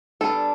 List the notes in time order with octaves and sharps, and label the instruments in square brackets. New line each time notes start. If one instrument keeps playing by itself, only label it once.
[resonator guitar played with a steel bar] G3 B3 D4 [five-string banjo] A4